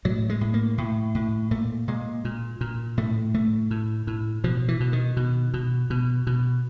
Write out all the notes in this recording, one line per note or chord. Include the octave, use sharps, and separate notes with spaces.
A2 F#3
G#3
A2
A#3
A2
A2
A#2 A3
A#2 G#3
A#2
A#2
A2 A3
A2 A3
A2
A2
B2 F3
E3
B2
D#3
B2
B2
B2
B2